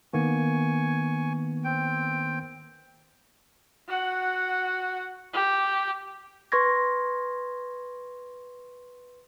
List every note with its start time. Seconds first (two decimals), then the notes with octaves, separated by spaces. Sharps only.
0.13 D#3 A#3 B3 G#5 C#6
1.64 C4 G5
3.88 F#4 F#5
5.33 G4
6.52 B4 C6 C#6 G#6 A#6